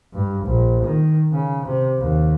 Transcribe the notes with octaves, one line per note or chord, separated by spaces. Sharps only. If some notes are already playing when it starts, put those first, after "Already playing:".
G2
A#1
D#3
C#3
C3
D#2